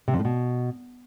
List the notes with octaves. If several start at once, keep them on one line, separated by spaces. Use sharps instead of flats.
C3
F2
A2
B2